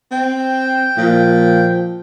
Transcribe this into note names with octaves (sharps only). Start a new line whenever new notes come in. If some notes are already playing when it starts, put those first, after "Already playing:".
C4 G5
A#2 F3